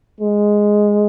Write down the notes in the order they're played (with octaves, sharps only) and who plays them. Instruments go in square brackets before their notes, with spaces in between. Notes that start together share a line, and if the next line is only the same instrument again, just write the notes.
[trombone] G#3